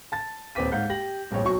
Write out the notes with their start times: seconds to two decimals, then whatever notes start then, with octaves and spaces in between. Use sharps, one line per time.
0.12 A5 A6
0.55 D#1 C4 B4 D6 B6 D#7
0.72 G#2 F5 F#5 G6
0.90 G4 A#6 F#7
1.31 D1 A#1 G2 C4 C#5 G5
1.45 B1 F#3 C#6